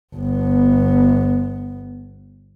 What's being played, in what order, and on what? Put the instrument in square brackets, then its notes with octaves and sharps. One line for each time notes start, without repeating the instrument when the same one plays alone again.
[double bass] G1 B3